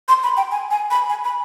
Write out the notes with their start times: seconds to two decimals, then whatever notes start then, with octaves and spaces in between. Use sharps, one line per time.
0.08 C6
0.23 B5
0.37 G5
0.52 G#5
0.71 G#5
0.91 B5
1.09 G#5
1.25 B5